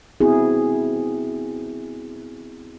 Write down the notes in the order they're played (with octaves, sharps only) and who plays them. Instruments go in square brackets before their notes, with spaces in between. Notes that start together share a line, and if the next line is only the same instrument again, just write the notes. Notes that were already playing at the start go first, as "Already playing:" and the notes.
[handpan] B3 C4 E4 F#4 G#4